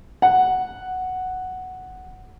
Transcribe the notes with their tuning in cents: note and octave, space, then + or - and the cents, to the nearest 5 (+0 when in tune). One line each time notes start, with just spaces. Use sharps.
F#5 +0